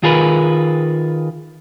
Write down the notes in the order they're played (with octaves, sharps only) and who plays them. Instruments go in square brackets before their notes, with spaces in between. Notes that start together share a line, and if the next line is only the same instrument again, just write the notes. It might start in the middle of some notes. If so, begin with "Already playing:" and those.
[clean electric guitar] D#3 F4 G#4 A#4 B4